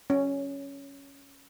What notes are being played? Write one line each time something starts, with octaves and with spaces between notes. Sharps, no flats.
C#4